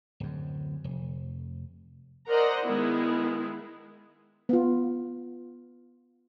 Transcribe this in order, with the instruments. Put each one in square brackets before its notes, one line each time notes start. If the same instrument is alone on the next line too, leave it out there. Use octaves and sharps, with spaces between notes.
[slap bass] D1 F#2
F1
[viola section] A#4 C5 D5 D#5 F#5 A#5
D#3 G#3 B3 E4
[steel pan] B3 F4